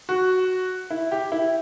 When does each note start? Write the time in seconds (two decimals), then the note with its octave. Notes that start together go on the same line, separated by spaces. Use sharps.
0.09 F#4
0.91 E4
1.11 G4
1.32 E4